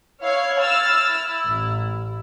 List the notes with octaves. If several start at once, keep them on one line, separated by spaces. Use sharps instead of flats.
E4 C#5 F5
E6 F6 A6
A1